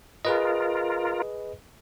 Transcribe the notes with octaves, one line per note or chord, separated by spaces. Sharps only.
F4 G#4 A#4 B4 D#5